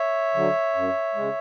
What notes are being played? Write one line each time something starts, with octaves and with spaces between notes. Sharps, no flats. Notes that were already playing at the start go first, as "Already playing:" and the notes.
Already playing: C#5 E5
D3 F#3
F#2
C#3 G#3